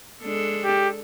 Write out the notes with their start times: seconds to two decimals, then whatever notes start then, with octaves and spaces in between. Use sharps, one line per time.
0.23 G#3 D4 A4
0.65 G4